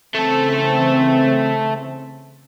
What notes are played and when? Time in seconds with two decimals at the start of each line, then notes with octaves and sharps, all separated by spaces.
0.15 C#3 E3 A3 C4 A4